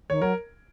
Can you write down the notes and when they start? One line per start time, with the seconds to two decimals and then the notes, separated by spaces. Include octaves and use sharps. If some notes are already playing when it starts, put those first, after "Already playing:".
0.10 D#3 C#5
0.22 F#3 A#4